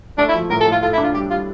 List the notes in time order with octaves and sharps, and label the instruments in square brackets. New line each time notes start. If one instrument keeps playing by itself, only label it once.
[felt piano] A3 [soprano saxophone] D4
[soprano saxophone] E4
[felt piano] F3
[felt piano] A2 [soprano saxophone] A#4
[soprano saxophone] A4
[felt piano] A2
[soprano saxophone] F4
[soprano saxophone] F4 [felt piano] A4
[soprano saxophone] E4
[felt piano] D4
[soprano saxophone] F4
[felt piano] G3 [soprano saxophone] G4
[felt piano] G3 [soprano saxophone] F4